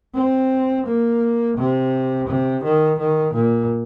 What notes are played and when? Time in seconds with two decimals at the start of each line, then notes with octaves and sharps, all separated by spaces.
0.15 C4
0.86 A#3
1.57 C3
2.28 C3
2.64 D#3
2.99 D#3
3.34 A#2